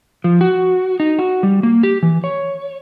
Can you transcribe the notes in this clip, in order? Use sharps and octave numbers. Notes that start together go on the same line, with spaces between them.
F3
F#4
D#4
F#4
G3
A#3
G4
E3
C#5